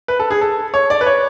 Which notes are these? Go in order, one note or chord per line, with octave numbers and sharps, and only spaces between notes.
B4
A4
G#4
A4
C#5
D5
B4
C#5